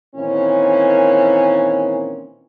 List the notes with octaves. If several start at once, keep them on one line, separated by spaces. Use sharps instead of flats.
A#2 D#3 E3 C4 C#4